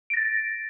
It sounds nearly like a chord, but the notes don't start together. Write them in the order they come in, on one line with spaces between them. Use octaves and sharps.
D7 A#6 A6